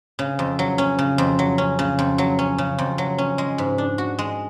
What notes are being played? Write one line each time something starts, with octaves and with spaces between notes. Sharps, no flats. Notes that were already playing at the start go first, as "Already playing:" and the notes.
C#3
F2
F#3
C#4
C#3
F2
F#3
C#4
C#3
F2
F#3
C#4
C#3
F2
F#3
C#4
G#3
G#2
D4
F#4
G#3